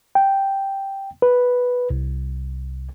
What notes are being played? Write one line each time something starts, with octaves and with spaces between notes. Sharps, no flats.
G5
B4
C2